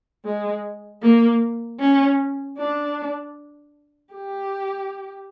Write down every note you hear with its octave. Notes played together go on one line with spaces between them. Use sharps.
G#3
A#3
C#4
D4
G4